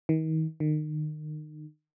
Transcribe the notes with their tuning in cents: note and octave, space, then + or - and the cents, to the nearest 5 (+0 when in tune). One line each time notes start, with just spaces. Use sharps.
D#3 +35
D#3 -30